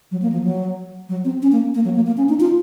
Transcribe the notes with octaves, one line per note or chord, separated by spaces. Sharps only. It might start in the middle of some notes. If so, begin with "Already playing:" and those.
F#3
A#3
F3
F#3
F#3
C4
C#4
A#3
A#3
F#3
A#3
A#3
C#4
D#4
F4